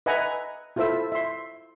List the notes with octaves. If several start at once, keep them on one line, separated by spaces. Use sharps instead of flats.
B4 D#5 E5 F#5 G#5 A#5
E4 F4 A4 C5 E5 E6
E5 C6